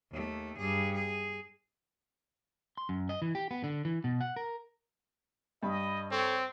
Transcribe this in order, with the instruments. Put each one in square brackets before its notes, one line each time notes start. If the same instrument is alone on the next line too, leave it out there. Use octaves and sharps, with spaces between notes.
[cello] D#2 A3
G2 G#4
G#4
[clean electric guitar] C6
F#2
D#5
E3
G4
B3
D3
E3
B2
F#5
A#4
[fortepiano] G2 [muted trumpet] D#5 [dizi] B5
[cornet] C4 [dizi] A4 [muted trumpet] C#5